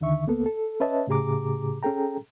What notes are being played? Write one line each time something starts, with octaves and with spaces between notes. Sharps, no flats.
D#2 D3 D#3 E5 C#6
C#2 A#3 B3 A4
A4
C#4 B4 C#5 D#5 E5 A5
A2 C#3 G4 G#4 A#5 D6
C#4 G#4 A4 G5 A#5